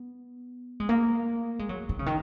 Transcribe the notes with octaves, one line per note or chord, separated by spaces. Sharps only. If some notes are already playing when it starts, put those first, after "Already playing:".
Already playing: B3
G#3
A#3
G#3
F#3
D#3
C#3
D#3